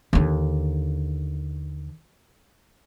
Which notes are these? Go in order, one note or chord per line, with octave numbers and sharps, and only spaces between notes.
D#2 D3